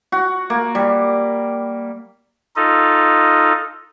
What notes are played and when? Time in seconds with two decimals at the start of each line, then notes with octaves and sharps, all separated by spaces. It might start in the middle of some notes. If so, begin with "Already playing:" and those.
0.12 F#4
0.50 A#3
0.75 G3
2.56 D#4 F4 A4 D#5